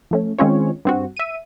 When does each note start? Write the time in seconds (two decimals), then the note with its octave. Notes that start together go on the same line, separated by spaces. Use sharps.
0.11 F3 A3 C#4
0.39 D#3 G#3 C4 C#4 F4 C#5
0.85 G2 C4 F#4
1.17 E5 D#7